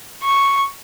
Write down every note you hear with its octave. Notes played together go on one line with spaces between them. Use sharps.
C#6